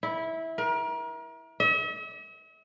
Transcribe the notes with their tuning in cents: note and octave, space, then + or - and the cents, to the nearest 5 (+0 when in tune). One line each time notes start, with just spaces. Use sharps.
E4 -15
A#4 +35
E5 -45